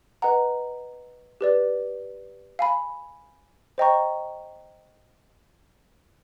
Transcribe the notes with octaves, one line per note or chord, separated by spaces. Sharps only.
B4 D#5 F#5 A#5
G4 B4 D5
F5 G#5 B5
C5 D#5 G5 A#5 C#6